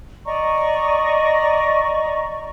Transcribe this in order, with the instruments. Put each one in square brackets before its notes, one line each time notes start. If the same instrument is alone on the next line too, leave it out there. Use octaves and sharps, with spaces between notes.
[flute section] D5 D#5 A#5 C#6